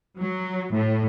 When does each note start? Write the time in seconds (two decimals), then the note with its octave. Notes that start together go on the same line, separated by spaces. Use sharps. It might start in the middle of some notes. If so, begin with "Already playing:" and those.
0.19 F#3
0.73 A2